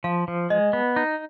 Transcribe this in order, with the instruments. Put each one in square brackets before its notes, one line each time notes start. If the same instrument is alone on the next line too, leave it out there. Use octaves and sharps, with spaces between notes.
[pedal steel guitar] F3 [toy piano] F5
[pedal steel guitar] F3
[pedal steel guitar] G#3 [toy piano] D#5
[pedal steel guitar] B3
D#4